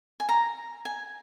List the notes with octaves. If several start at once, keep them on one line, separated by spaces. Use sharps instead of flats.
G#5
A#5
G#5